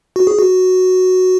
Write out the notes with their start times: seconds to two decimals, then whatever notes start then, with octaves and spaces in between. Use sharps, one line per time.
0.16 F#4
0.27 G#4
0.39 F#4